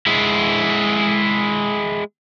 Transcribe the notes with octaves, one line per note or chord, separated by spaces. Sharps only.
G#3 E4